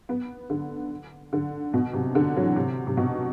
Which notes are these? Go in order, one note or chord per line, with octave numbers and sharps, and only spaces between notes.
B3
D3
D3
B2
C3
D3
F#3
E3
C3
C3
B2